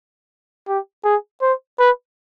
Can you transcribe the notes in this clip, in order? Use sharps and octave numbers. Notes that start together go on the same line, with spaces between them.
G4
G#4
C5
B4